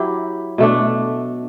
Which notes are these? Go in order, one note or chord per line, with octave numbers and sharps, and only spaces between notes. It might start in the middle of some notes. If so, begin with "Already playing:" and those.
Already playing: F#3 E4 G4
B2 A3 D4